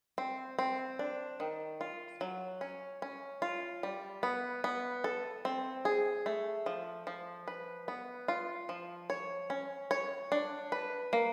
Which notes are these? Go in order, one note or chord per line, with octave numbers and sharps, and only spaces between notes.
C4
C4
D4
D#3
F4
F#3
C#4
C#4
F4
G3
B3
B3
A4
C4
G#4
A3
F3
F3
B4
B3
F4
F3
C#5
C#4
C#5
D4
B4
A#3